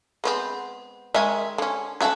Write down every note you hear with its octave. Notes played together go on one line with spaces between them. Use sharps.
G#3 B3 C4
D#3 G#3 C#4 E5
D3 C#4
C#4 D4 F#4 A4 E5